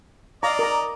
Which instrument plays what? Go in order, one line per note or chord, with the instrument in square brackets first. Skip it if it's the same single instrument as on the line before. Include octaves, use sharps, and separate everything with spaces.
[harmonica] D5 D#5 [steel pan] F5 A#5
[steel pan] A#4 A#5